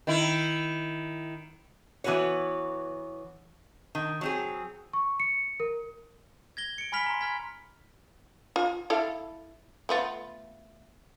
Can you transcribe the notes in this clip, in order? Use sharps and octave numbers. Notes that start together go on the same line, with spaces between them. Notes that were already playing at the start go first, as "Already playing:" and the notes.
D#3 E4
E3 B3 F#4 B4 C#5
D#3
F#3 C4 G#4
C#6
C#7
A#4
G#6 A#6 G7
C#7 D7
G#5 B5 F6 B6 F7 G7
A#5 C6
B5 F6 G#6 B6
F4
E4 A4 F5
A3 B3 F4